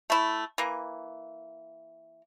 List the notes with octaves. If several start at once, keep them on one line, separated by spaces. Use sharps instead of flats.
A3 E4
E3 A#3